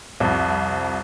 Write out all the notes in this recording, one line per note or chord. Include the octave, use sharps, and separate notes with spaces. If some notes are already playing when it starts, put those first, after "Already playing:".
C2 F2